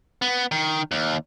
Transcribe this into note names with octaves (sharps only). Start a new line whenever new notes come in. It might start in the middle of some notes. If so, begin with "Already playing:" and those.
B3
D#3
D#2